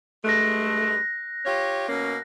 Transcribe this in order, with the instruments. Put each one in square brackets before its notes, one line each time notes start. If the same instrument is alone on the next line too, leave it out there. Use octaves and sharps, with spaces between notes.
[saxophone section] G2 G#3 A3 [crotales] F#6 A#6
[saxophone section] F4 G4 C#5
B2 A#3 C#4